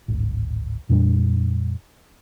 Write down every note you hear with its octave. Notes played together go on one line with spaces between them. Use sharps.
D1 G#1
F2 A#2 G3 D4